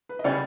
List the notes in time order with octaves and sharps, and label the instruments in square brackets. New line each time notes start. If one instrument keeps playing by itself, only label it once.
[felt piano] B4
D#5
[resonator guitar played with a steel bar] C#3 G3 B3 [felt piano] C#5